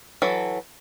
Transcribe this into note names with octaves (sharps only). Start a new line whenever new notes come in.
E3 F#3 A4